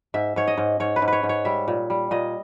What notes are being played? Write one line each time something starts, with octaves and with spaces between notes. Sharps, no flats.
G#2 E5
G#2 C#5
D#5
G#2
G#2 C#5
B4
G#2
B4 C#5
G#2
C#5
G3 E5
A#2
G3
A#2 D#5